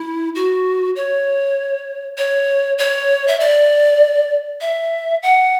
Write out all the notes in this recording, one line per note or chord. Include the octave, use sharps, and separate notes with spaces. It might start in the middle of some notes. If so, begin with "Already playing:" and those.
Already playing: E4
F#4
C#5
C#5
C#5
E5
D5
E5
F#5